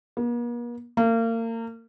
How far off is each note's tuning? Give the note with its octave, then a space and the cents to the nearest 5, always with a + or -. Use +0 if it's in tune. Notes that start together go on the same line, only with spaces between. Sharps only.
A#3 +45
A#3 -35